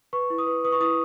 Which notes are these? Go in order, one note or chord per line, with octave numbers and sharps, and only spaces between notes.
B4 C#6
E4
D#6
B4
B4 D#6
C#6
E4 D#6